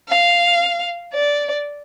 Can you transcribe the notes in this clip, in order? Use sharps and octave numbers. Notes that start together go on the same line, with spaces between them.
F5
D5